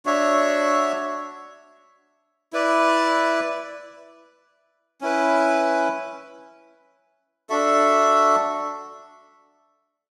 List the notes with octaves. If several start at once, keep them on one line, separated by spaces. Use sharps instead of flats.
D4 F#4 C#5 E5
E4 B4 D5
C#4 E4 B4
D4 F#4 A4 E5